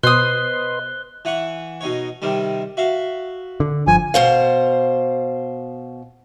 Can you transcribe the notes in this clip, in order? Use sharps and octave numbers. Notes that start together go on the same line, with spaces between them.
B2 B4 C5 D#5 C6 D#6 F#6 G7
E3 F#5 C#6
B2 D#4 C#5
C3 D#3 G3
F#4 E5 F5
D3
G1 F3 G#5
B2 C5 F5